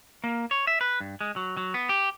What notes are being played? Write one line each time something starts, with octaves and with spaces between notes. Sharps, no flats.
A#3
C#5
E5
B4
G2
G#3
F#3
F#3
B3
G4